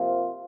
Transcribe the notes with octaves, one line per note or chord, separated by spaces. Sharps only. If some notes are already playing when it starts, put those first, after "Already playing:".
Already playing: C3 F3 A#3 F4 C5